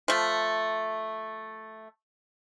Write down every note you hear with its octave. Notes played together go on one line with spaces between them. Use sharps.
F3 A3